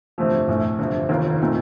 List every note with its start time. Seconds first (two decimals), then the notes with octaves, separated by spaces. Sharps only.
0.18 G1 F2 C3 F3 A3
0.48 A#1 A2 A3
0.79 G1 F2 C3 F3
1.09 F1 D#2 D#3 A#3 F4
1.41 A#2 A3 C4 D#4